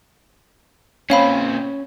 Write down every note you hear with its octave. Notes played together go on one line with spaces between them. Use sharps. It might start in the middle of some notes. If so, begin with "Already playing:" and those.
A#2 C4 C#4 C#5 F5 B5